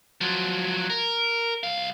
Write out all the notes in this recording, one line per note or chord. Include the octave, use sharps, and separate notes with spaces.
F3 F#3
A#4
C2 F5